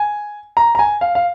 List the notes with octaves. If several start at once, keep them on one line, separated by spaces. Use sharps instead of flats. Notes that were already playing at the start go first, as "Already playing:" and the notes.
Already playing: G#5
A#5
A#5
G#5
F5
F5